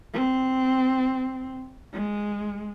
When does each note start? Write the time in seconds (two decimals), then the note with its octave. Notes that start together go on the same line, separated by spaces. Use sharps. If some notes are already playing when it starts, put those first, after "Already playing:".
0.14 C4
1.92 G#3